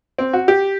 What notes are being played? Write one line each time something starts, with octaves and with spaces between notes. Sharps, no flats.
C4
F#4
G4